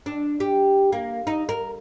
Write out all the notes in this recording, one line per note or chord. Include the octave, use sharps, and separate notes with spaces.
D4
G4
A#3
D#4
A#4